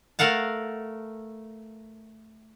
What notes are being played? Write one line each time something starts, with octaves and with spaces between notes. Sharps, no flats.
A3 A#4 F5 F#5 A5